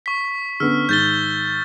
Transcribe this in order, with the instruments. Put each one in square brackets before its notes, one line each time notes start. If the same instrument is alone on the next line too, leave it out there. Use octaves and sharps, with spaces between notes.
[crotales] C#6 B6
[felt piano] D3 B3 C#4 [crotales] E6 F6
[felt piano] G#2 D#3 [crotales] G6 A6 G7